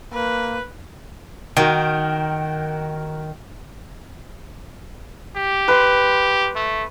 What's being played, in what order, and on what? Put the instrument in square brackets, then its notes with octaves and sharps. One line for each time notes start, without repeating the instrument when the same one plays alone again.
[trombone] A#3 [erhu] B4
[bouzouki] D#3 [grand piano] F#4 A#4 G5
[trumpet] G4
[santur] B4 C6
[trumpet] A3